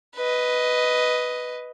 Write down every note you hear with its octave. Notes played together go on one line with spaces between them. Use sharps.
B4 D#5